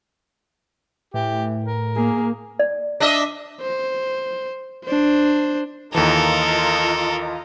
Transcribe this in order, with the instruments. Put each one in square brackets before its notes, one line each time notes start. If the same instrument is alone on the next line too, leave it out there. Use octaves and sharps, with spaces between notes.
[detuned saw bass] A2 [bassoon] E3 [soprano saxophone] G4
[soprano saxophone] A#4
[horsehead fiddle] A#3 [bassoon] G#4
[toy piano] D5
[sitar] D4 D#5 E5
[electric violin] C5
D4 C5
[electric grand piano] D#2 E3 [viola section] F4 D#5 A#5 [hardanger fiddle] A4 A#4